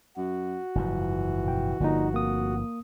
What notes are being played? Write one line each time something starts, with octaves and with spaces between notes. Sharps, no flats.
F#2 F#4
F#1 G#2 E3 F3
B2 G5
G1 A#2 D3 F3 D#4
F1 A#3 D#6